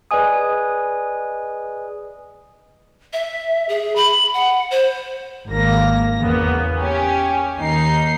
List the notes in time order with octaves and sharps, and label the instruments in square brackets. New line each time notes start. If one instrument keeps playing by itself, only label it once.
[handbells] G#4 B4 D5 D#5 G#5 D#6
[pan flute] E5
G#4
B5
F#5
C5
[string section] G#1 A#3 A#6
E2 C#3 A#3 B3
C#4 G4
D#2 D#4 C7